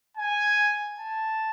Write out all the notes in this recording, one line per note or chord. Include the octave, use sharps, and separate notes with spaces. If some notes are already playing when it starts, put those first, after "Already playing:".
G#5
A5